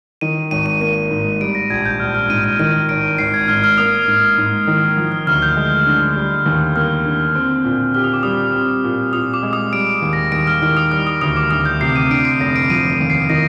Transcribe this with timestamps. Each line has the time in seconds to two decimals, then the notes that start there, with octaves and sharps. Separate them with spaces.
0.21 D#3 D#7
0.51 G#1 D#7
0.66 D#7
0.81 A#3 D#7
1.11 G#2
1.41 G3 D7
1.55 A#6
1.70 A#1 G#6
1.85 G6
2.00 A#1 F6
2.15 F6
2.30 G#2 D#7
2.44 D#7
2.59 D#3 D#7
2.89 G#1 D7
3.18 G#1 C7
3.34 G#6
3.48 G#2 F6
3.64 F6
3.78 A#3 D#6
4.08 G#2
4.38 G#2
4.67 D#3
4.97 F3
5.12 F6
5.27 D2 F6
5.42 G6
5.57 G#3
5.86 D3
6.16 G3
6.46 D#2
6.76 A#3 F6
7.05 D3
7.35 C4
7.65 A#2
7.94 G4 F6
8.04 D#6
8.14 D6
8.23 G3 D#6
8.54 C4
8.84 A#2
9.13 A#2 D#6
9.34 D6
9.43 G#3
9.53 D#6
9.73 G3 D7
10.02 D#2
10.13 A#6
10.32 D#2 D7
10.47 F6
10.62 D#3 F6
10.77 D#6
10.92 G3 F6
11.07 D#6
11.21 D2 D#6
11.36 D6
11.51 D2 D#6
11.65 G6
11.81 C3 C7
11.96 D#7
12.11 D3 D7
12.25 C7
12.40 F1 A#6
12.56 D7
12.70 F3 D#7
12.90 D#7
13.00 D#2
13.10 C7
13.29 D#3 A#6